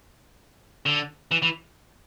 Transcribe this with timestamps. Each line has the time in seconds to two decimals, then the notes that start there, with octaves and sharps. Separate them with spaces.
0.86 D3
1.31 E3
1.42 E3